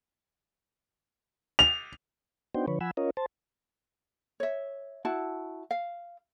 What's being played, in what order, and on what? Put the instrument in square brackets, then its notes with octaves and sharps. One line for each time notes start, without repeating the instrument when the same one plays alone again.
[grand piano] F7
[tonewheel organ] B3 D4 D#4 F#4 C5 G5
D3 F3 B4 C#5
F3 F#5 G#5 B5 E6
C#4 F4 A#4 C#5 D#5
C5 A5
[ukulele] C#5 E5
E4 F#4 A5
F5